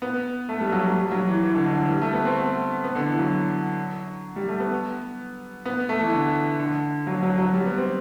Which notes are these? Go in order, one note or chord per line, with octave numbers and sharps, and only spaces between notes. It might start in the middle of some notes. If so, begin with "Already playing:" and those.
B3
A3
G3
F#3
F#3
G3
F#3
E3
E3
D3
D3
E3
G3
A3
B3
C4
A3
B3
D3
E3
F#3
G3
A3
B3
B3
A3
E3
D3
D3
F#3
F#3
F#3
G3
B3
C4